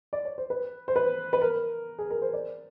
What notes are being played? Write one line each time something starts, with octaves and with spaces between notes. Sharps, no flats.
D5
C#5
C5
B4
C5
B4
B4
A#4
G#4
A#4
C5
D5